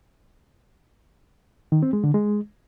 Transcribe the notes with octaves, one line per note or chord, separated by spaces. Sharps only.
D#3
C4
G#3
D3
G#3